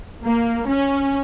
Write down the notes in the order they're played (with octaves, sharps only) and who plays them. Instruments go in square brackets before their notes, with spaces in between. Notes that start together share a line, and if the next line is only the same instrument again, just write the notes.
[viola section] A#3
C#4